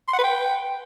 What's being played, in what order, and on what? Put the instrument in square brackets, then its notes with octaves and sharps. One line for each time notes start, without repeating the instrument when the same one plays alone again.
[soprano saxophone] C6
F#5
B4
G5